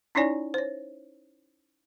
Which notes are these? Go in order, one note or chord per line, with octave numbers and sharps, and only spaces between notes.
C#4 D#4 E4 C#5 D5 G#5
C5 C#5